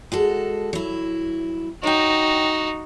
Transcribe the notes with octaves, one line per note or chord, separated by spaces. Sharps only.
G#3 F#4 A4
F#3 E4
D#4 F#4 C#5 G5